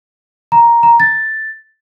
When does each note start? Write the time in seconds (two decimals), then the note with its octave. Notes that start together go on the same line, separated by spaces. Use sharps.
0.52 A#5
0.83 A#5
1.00 A6